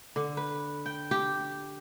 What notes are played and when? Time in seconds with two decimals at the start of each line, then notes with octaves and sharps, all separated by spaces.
0.16 D3
0.37 B4
0.86 G5
1.11 G4